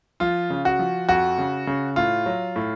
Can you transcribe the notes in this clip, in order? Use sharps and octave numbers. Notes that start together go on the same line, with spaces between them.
F3 F4
C#3
F#4
F3
F2 F#4
C#3
C#3
A2 F4
F#3
A2